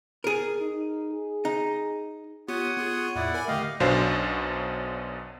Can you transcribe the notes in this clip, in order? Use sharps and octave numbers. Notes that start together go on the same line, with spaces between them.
G#4 A#4
D#4
G#4
D#4
B3 F4 G4 C#5 F#5 D#6
B3 F4 G#4
E2 A2 E4 D5 F#5
A#4 G#5 B5
D3 A3 G4 D#5 F5
B1 F#2 B2 D4 C5 F5